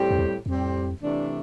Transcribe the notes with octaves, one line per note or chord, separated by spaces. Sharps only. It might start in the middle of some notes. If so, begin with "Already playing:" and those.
Already playing: A2 G3 C4 G4
F2
E2
F2 A2 G3 C4 G4
C3 E3 A3 D4